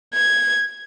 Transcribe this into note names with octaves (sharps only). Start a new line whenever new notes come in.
G#6